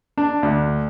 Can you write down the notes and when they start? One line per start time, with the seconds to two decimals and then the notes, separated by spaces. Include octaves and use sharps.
0.18 D4
0.43 D2